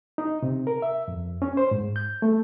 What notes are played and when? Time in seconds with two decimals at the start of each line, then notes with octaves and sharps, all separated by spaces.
0.18 D#4
0.43 C3
0.67 A#4
0.82 E5
1.08 F2
1.42 C#4
1.57 C5
1.71 G#2
1.96 G6
2.22 A3